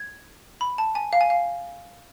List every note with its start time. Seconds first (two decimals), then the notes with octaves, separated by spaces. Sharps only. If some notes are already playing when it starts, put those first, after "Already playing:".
Already playing: G#6
0.61 B5
0.78 A5
0.95 G#5
1.13 F5
1.21 G#5
1.30 F5